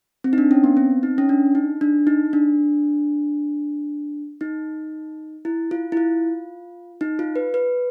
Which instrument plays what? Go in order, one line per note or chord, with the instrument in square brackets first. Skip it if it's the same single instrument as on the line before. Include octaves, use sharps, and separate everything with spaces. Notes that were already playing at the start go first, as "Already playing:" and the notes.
[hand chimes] C4
D#4
D4
C#4
B3
C4
D#4
C#4
D4
D#4
D4
D#4
D4
D#4
E4
F4
E4
F4
D#4
F4
B4
B4